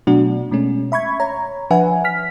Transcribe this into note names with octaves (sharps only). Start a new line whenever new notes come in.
B2 F#3 A3 D4 F#4
B2 G#3 A3 C#4
E5 B5 C#6 G#6
C#5 A#5
F3 D4 B4 E5 F#5 G#5
F6 B6